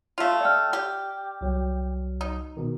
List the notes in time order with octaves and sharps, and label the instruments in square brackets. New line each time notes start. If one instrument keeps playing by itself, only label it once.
[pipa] A3 F4 [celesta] F5 F7
[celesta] D5 G5 F6
[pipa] G4
[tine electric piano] C2 F#3
[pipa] D#4
[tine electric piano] B2 D#3